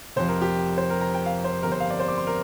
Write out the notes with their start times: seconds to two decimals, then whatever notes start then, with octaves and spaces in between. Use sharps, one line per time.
0.16 F1 F2 F3 C5
0.28 A#4
0.42 G4
0.78 C5
0.90 A#4
1.01 A#5
1.14 G5
1.26 F5
1.44 C5
1.63 G1 F2 C3 A#4
1.72 C5
1.80 F5
1.90 D5
2.00 C5
2.08 D6
2.18 C6
2.27 A#4